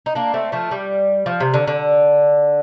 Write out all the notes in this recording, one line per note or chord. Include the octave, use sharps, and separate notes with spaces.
D#4
A#3 D4
A3 C4
F3 A3
G3
F3
C3
D3
D3